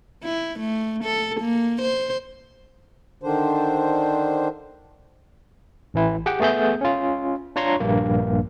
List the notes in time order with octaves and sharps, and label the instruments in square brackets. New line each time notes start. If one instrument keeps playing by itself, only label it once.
[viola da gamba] E4
A3
A4
A#3
C5
[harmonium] D3 D#3 D4 C5
[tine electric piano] A1 E3 E4
G4 G#4 F#5 G5
A3 B3 G#4 E5 G6
C#4 F4
D4 F4 C#5 A#5 C6 C#6
A#1 G2 A#3